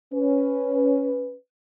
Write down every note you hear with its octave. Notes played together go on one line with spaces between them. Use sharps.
C#4 B4